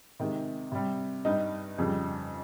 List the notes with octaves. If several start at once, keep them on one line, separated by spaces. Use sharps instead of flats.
C3 D#3 G#3
C3 G3
G2 G3 D#4
F2 C#3 G3